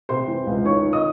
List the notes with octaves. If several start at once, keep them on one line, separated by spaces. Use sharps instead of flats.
C3 C5 C6
E3
C#2
D#3 C#5 C#6
D#3
D#5 D#6